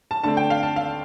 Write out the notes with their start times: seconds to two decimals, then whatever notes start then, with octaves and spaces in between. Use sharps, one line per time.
0.11 A5
0.24 D3 A3 C4 A5
0.37 G5
0.50 F5
0.63 A5
0.76 F5